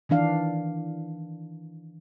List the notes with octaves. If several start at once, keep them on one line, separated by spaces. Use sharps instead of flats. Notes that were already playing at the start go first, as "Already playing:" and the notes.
D#3 E3 D4 F5